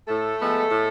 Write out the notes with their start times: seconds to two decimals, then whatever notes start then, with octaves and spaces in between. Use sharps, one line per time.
0.08 A2 A3 A4
0.40 F3 G#3 B3
0.71 A2